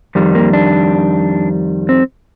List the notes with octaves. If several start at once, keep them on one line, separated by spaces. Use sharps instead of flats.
F2 D#3 G3
A#3
D4
C4